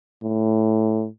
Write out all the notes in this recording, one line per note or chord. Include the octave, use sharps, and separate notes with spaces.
A2